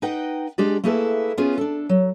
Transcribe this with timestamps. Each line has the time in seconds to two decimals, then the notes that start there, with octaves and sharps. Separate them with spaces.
0.02 D#4 B4 D#5 F#5 G5
0.58 G#3 D4 G4 G#4 D5
0.84 A3 A#3 E4 G#4 A4 B4
1.37 B3 C#4 F4 G#4
1.58 D4 A4
1.89 F#3